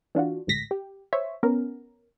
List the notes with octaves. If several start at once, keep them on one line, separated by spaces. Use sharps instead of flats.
E3 D4 F4 F#4
A1 D2 G#2 A#6 B6
G4
C5 C#5 E5
B3 C#4 A#4